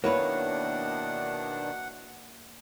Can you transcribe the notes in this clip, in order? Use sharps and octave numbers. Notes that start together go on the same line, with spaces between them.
B2 D#3 A#3 D4 E4 B4 C#5 F#5